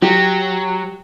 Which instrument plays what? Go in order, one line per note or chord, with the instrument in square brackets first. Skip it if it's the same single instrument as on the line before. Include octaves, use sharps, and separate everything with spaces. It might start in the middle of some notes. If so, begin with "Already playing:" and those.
[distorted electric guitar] F#3 [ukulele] G4